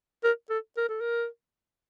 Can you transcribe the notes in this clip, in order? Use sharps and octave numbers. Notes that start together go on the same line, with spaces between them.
A#4
A4
A#4
A4
A#4